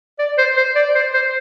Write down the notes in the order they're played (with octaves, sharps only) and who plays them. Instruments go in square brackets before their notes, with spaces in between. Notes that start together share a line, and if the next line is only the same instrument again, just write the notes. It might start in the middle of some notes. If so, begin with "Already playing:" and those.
[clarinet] D5
C5
C5
D5
C5
C5